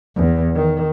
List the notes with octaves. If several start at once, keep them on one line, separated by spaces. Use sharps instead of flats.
E2
D#3